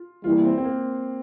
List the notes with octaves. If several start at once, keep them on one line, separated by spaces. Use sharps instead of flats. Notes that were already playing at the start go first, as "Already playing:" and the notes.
Already playing: F4
E3 G3 A#3 E4 F4
C4
C4
A#3